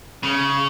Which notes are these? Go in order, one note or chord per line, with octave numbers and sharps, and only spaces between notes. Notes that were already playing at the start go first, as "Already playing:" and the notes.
C#3